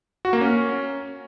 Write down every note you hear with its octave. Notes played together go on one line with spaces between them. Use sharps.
F#4
A#3
C#4